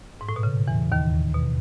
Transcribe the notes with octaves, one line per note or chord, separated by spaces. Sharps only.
G#2
A2
B2
C#3
E2 E3
D#2 D#3
B2